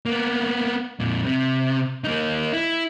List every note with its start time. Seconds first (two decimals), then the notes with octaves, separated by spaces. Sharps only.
0.06 A#3 B3
1.00 F2 A#2
1.24 C3
2.04 A#3 D#4
2.53 E4